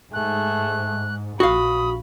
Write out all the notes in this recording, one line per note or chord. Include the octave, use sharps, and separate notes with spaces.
G#2 A3 G#4 F#6
A#1 F#4 F5 B5 D#6